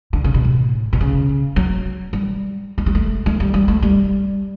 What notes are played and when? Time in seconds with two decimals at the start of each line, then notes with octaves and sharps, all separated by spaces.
0.13 D3
0.24 C#3
0.34 B2
0.44 A2
0.93 B2
1.01 C#3
1.56 F#3
2.13 G3
2.78 A3
2.86 G3
2.95 A3
3.26 A3
3.40 G3
3.54 G3
3.68 A3
3.82 G3